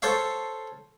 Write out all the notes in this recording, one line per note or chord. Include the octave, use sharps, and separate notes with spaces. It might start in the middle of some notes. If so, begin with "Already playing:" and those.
A4 C5 C#5 F5